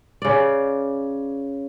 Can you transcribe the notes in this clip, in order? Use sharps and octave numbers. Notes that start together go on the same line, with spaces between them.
C#3 D5